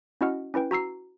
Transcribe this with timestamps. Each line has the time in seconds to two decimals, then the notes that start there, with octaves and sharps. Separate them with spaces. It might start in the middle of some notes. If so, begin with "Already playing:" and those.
0.21 C#4 E4 F#4 D#5 F#5 F6
0.54 C#4 E4 B4 G5
0.71 F#4 A#5 E6 C7